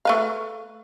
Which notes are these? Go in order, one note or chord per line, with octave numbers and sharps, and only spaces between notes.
A3 B4 F5